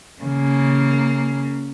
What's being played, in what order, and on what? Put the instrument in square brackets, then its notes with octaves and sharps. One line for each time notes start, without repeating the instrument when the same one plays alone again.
[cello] C#3 A#3